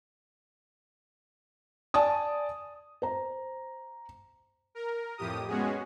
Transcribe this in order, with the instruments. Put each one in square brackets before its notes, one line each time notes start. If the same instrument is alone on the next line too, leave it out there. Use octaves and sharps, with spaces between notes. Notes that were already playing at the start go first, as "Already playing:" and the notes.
[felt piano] D5 G#5 A5 D#6
C5 A#5
[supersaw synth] A#4
F2 A2 G4 D#6
G#3 B3 C#4 F#4 G#4